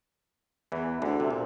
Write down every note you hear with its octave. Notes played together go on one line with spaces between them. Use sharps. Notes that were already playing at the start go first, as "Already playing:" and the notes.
E2 E3
D2 D3
C3
A#2